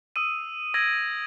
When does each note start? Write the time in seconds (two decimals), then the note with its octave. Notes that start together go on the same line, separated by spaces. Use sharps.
0.16 D#6 E6 D#7
0.74 D#6 E6 G#6 A#6 D7 F#7